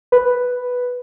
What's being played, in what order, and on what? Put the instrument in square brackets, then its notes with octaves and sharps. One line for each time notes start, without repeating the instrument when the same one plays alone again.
[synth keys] B4